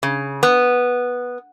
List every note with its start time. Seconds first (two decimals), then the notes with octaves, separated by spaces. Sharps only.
0.03 C#3
0.43 B3